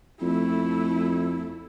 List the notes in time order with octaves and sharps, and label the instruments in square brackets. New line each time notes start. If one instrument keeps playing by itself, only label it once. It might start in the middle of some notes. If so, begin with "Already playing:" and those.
[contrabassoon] F2 [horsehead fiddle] A3 E4